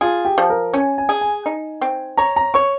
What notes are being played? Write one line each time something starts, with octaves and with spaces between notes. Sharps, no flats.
F4 G#4
G4
F3
A#4
C#4 G#5
G#5
G#4
G#5
D#4
C4
C#5 A#5
A#5
C#5 C#6